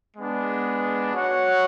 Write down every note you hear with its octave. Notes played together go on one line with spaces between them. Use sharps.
G#3 B3 D4
F#4 C#5 F#5